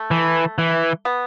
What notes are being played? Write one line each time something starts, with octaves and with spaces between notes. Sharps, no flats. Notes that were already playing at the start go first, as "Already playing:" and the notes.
Already playing: A3
E3
E3
B3